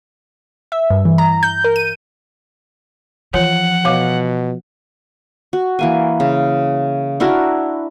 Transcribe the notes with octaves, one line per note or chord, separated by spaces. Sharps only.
E5
G2
E3
A#5
G6
A#4
D#7
E3 F3 C#5 F#5
B2 C#5 F5 D6
F#4
E3 A#3 G#5
C#3
D4 E4 F#4 A#4